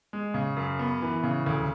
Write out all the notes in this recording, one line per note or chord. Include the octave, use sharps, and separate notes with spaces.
G#3
C#3
F#2
B3
E3
C#3
D2